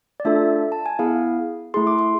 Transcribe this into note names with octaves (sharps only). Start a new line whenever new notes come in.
D5
A3 D4 F4 A4 E5
A5
G#5
B3 E4 G#4 F5
A3 E4 G#4 C6
D6
C6